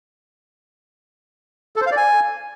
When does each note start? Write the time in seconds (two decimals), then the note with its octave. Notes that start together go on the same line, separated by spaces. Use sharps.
1.76 A4
1.81 C5
1.86 F5
1.92 D5
1.97 G#5